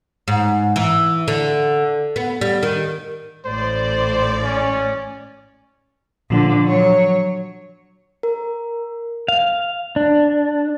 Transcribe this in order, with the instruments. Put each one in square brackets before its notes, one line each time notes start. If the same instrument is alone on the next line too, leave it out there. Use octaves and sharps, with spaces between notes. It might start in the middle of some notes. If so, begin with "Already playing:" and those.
[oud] G#2
E3
D3
B3
G3
D#3
[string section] A1 A2 D5 [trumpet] C5
[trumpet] C#4
[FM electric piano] A#2 F3 [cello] D3
[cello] F#3 C#5
[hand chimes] A#4
[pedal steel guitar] F5
D4